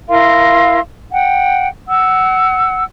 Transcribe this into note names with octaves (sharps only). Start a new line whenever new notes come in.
E4 A#4 F5 C6
F#5 G5
F#5 E6